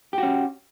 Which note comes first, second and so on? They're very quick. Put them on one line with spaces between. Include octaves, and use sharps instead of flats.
G4 F#4 C#4